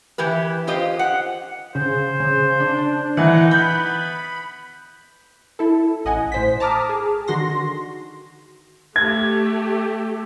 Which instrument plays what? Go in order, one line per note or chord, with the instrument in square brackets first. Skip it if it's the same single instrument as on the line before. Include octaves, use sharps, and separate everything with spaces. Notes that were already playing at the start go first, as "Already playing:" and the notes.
[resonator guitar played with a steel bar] E3 E4 G4 B4
F4 G4 C5 D#5
F#5
[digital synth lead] C#3 [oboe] C5
[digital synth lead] C#3
D4
[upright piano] E3 [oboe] D#4 [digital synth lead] F#5
[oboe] B3 [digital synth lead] B5 [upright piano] G6
[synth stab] E4 A4
A1 D#5 F#5 G#5
A2 C5 B6
A5 A#5 D6 D#6 F6
G#4
D3 D#3 F#4 C6 A#6
[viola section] A3 G4 [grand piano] G#6